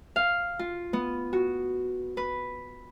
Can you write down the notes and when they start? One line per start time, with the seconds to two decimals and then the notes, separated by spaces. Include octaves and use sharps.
0.16 F5
0.59 F4
0.93 B3
1.33 F#4
2.17 B4